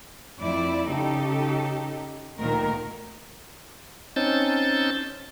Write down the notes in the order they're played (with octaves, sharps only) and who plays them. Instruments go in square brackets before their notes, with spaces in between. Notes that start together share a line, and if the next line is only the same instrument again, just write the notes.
[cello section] F2 E4 D5
C#3 D#4 G4 A4
D2 A#2 D#3 A#4
[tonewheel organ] C4 C#4 D#4 A5 G6 A6